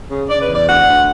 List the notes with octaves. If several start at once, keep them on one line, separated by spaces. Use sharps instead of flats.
C#3
C#3 D5
B4
E2
D5
D2 F#5
D2